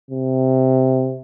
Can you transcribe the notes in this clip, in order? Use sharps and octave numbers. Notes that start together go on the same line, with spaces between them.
C3